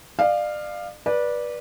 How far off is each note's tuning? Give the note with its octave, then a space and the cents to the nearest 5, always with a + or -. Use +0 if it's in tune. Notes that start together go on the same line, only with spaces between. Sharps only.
D5 +35 F5 +0
B4 -25 D5 +0